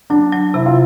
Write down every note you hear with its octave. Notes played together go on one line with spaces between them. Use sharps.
F#3 D4
F#3
C3 E4
F4